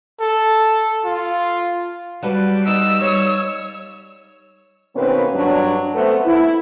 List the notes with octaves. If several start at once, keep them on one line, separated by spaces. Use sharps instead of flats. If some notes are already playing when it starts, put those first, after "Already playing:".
A4
F4
F#3 G3 A4 B4
D#4 D#5 F5 E6
G3 C#5
B2 D#3 A#3 C4 C#4 B4
G2 F#3 D4
A3 B3 C4
E4